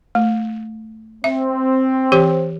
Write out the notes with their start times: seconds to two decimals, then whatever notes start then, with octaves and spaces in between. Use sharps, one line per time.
0.15 A3
1.24 C4 E5
2.12 E3 G4 C5